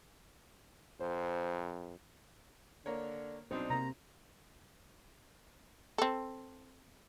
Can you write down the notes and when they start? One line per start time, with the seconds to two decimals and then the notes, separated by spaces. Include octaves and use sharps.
1.00 F2 C5
2.86 D3 A#3 A#4 C#5
3.51 B1 C4 D4 D#4 C5
3.70 C3 A#3 A#5
5.98 C4 A4